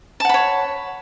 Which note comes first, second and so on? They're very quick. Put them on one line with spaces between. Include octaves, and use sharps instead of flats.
A5 F#5 B5 C#5